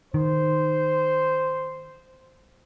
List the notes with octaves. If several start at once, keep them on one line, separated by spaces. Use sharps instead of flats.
D#3 C5